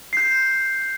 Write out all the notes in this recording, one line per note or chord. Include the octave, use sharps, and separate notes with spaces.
G6 C7